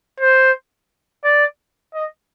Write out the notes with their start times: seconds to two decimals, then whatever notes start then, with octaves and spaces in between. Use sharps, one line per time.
0.20 C5
1.24 D5
1.94 D#5